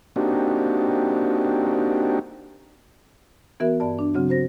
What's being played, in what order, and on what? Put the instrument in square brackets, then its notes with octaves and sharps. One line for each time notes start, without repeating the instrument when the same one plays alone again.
[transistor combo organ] A#3 C4 D4 D#4 F#4 G4
[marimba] E3 B3 F#4 A#4 E5
G2 D5 A5
D4
C#3 F#3 C4 F#4
F#4 C5 A#6